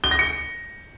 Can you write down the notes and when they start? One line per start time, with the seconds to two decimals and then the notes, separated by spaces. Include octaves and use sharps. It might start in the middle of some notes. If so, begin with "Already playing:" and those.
0.04 G7
0.11 A#6
0.19 C#7